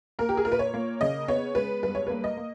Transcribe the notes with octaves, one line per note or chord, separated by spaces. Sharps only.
A#3 A#4
G4
G#4
A#2 A#4
B4
C#5
A#3
C#3 D#5
B3 C#5
G#3 B4
G2 B4
C#5
A#3 B4
D#5
A#3